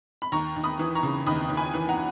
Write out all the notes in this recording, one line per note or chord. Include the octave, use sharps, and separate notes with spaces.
B5
D#2 A#5 C#6
D#2
B5 D#6
E3
A#5 C#6
C#3
D#2 B5 D#6
D#2
G#5 B5
E3
F#5 A#5